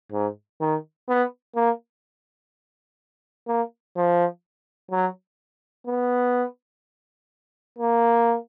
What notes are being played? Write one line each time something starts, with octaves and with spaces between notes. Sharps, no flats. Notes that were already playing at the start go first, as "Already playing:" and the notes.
G#2
D#3
B3
A#3
A#3
F3
F#3
B3
A#3